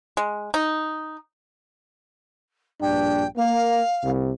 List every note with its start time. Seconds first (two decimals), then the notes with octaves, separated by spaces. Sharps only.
0.17 G#3
0.54 D#4
2.81 A#1 G2 D4 G5
3.36 A#3 F5
4.04 C2